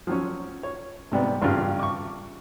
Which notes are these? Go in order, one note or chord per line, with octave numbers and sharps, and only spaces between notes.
F3 F#3 C#4
C#5
G#2 C3 G3 B3
G#1 G2 C#3 G3 F4 G4
C#6 D6